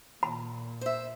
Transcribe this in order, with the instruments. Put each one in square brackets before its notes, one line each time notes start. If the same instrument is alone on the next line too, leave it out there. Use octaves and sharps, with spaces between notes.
[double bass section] A#2 [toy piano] B5
[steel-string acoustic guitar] C5 E5